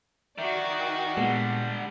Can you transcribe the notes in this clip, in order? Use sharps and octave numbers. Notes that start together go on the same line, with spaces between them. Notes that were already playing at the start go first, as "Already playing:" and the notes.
D#3 F#4 D5 E5
A#2 D3 G3 G#3 B3 F#5 A5